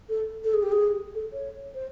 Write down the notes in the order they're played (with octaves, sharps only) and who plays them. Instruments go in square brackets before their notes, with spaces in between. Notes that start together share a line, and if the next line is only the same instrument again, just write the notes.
[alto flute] A4
A4
G#4
G4
G#4
A4
C#5
C5